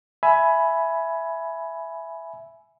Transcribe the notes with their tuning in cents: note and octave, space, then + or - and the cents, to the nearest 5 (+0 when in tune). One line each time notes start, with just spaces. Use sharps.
E5 +5 G#5 +15 B5 +0